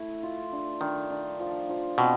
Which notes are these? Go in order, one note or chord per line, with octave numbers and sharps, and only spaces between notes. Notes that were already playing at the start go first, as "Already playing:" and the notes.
Already playing: A3 E4
F4
D4
D#3 D4
D4
F3
F3
B2 C4